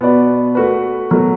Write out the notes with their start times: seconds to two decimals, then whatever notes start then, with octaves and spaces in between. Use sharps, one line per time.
0.01 B2 B3 F#4 B4 D5
0.55 A3 F#4 B4
1.10 B2 F#3 A3